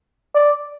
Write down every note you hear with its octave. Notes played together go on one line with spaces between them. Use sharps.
D5